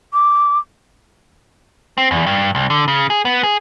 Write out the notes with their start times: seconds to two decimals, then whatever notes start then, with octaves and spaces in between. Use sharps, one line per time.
0.13 D6
1.98 C4
2.11 E2
2.26 G2
2.55 C2
2.70 D3
2.88 C#3
3.10 G#4
3.25 B3
3.43 G#4